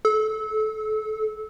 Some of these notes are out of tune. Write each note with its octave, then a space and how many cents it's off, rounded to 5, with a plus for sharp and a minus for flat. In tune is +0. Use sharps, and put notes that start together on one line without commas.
A4 -25